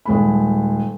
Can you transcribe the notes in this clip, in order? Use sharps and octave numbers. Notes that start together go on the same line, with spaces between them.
D#1 G#3 B5